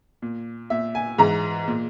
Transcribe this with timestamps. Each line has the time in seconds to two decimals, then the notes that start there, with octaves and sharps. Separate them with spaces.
0.22 A#2
0.70 A#2 E5
0.95 G#5
1.18 G#2 E3 A#5
1.68 A#2